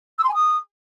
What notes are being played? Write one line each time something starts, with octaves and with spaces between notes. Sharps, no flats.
E6
C6
G#5
D#6